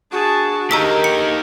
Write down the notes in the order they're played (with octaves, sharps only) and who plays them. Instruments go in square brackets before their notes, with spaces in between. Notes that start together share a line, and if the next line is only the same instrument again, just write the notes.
[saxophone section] D4 F#4 [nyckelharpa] G#4 A5
[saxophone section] D3 D#3 [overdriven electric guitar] A#3 D#4 [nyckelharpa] G4 [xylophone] A#5 E6 B6
[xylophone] C#7